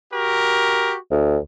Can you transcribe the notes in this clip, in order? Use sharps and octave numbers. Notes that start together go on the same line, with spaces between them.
F#4 G4 A#4
D2